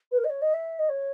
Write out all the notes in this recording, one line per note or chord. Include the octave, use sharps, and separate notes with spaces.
B4
A#4
D#5
C#5
D#5
E5
D#5
C#5